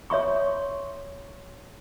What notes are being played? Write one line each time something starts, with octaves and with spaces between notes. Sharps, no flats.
C#5 E5 C6 C#6